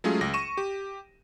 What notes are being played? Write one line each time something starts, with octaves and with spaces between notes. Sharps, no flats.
F#3 G#3 A3 C#4 F4 G#4
C#2 A#6
C#6 D#7 E7
G4